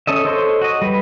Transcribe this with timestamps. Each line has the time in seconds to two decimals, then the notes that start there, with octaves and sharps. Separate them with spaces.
0.07 C#4 A4 D#5 E5
0.25 A4 C5 C#5 D#5 C6
0.61 F#4 D#5
0.82 G3 B4